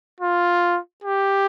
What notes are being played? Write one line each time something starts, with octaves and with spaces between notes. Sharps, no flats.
F4
G4